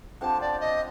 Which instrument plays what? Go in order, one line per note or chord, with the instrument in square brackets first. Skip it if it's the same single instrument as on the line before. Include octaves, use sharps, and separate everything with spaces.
[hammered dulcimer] D3 F3 C4 G4 [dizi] A5
[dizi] D5
D#5